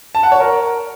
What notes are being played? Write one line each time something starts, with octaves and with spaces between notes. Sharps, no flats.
A5
F#5
C#5
A#4